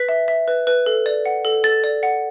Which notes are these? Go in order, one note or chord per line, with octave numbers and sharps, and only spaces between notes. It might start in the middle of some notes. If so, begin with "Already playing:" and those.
Already playing: B4 B6
E5
E5
B4
B4
A4
D5
F#5
A4
A4 A6
D5
F#5